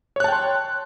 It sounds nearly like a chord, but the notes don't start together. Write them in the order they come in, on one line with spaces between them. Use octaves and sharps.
C#5 F#6 A5 G5 C6